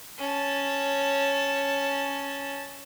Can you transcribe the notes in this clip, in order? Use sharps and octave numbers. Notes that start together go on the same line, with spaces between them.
C#4 A5